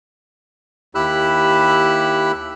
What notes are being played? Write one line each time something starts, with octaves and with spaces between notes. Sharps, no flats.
D#2 E4 G4 B5 E6 F#6